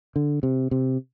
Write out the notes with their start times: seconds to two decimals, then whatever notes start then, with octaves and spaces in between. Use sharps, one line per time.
0.16 D3
0.43 C3
0.71 C3